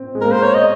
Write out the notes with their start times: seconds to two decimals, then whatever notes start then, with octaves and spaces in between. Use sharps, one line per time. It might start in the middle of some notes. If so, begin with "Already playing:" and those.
Already playing: C4
0.15 G#3
0.21 A#3 A#4
0.32 C5
0.43 C#5
0.54 D#5